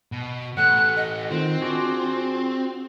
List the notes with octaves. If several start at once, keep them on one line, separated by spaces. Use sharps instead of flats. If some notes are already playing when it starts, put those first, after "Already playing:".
B2
E3 A3 F#5 F#6
D#5
D#3 C4 F4
D4 F#4 G#4